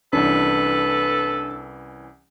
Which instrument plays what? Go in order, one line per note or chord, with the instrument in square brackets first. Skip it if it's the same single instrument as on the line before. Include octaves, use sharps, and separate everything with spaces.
[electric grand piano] C2 E3 C#4 [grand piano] D4 [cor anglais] A4 [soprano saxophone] B4